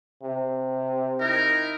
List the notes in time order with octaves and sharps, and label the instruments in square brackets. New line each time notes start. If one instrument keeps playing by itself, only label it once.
[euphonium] C3
[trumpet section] D#4 E4 A#4